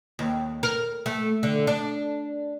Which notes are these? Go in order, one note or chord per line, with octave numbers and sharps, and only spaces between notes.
D#2
A#4
A3
D3
D4